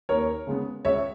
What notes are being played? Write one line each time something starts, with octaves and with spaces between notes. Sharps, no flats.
D#2 A#4 C#5
C#3 G#3 B3
C#2 C#5 E5